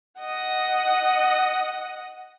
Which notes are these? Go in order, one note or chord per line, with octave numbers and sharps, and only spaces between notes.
D#5 F#5